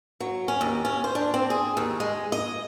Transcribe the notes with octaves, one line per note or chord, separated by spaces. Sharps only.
F#3
C#4
D#2
C#4
C5
D4
C4
G#4
D#2
G#3
D#5